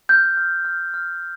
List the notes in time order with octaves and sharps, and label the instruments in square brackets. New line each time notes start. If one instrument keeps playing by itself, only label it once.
[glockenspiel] F6 G6
F6
F6
F6